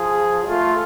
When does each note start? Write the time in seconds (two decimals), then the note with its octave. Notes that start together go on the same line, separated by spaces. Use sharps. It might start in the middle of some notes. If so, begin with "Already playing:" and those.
Already playing: F3 G#4
0.48 A3 F4